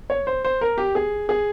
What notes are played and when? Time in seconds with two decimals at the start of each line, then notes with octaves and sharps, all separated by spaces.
0.10 C#5
0.27 C5
0.45 C5
0.61 A#4
0.78 G4
0.95 G#4
1.29 G#4